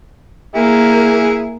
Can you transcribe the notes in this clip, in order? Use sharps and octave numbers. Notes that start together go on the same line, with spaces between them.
A#3 E4 G#4